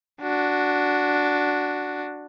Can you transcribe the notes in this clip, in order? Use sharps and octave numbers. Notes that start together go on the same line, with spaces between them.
D4 F#4